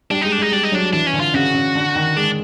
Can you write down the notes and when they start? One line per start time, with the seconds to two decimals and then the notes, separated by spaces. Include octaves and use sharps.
0.11 G3 D4
0.21 G#3 D#4
0.32 D4
0.38 G#3 D#4
0.52 G3 D4
0.63 D#4
0.72 F#3 D4
0.93 E3 D4
1.07 C#4
1.13 D3
1.20 F4
1.34 C#3 F#4
1.54 C#3
1.75 D3
1.95 D#3
2.16 G#3 D4